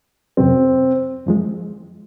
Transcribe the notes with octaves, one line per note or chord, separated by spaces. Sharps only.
F2 C3 F#3 C4
F#2 F3 G#3